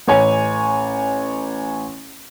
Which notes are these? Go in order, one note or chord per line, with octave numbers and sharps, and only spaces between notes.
A1 C#5 G#5